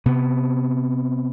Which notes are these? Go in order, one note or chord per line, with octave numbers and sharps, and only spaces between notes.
C3 B3